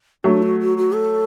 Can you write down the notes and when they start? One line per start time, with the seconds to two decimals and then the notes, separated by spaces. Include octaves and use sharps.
0.24 F#3 A3 D4
0.42 F#4
0.60 F#4
0.77 F#4
0.94 A4